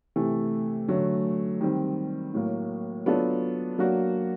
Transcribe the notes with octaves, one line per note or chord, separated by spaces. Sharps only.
C3 E3 A3
D3 F#3 A3
D#3 G3 C4
A2 F#3 A#3
F#3 B3 D4 F4 A4
F#3 A#3 D4 F#4